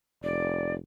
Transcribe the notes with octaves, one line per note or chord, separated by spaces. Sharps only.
F1 D5